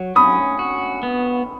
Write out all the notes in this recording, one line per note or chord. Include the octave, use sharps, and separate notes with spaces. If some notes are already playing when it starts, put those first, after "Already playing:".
Already playing: F#3
C#4 B5 D#6
F#4
B3